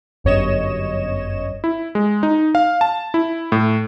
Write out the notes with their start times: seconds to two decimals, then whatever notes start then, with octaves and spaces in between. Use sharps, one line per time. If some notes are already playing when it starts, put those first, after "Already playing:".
0.24 G1 F#2 C#5 D#5 E7
1.64 E4
1.95 G#3
2.23 D#4
2.55 F5
2.81 A5
3.14 E4
3.52 A2